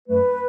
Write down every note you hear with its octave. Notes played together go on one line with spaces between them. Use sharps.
F#2 F#3 A3 B4